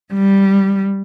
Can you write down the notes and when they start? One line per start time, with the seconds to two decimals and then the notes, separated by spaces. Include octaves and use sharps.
0.14 G3